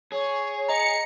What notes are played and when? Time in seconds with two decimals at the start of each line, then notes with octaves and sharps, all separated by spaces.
0.12 G#4 C#5
0.68 D#5 A#5 C#7